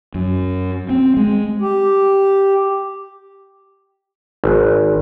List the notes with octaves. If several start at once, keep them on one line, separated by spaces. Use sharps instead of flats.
F#2
C4
G#3
G4
G#1